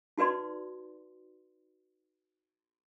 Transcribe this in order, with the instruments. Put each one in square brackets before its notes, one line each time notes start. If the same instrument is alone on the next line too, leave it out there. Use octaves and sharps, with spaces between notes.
[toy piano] D#4 F#4 B4 D5 C6